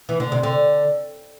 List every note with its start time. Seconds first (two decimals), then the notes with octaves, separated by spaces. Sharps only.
0.09 E3
0.20 D3
0.32 C3
0.43 D3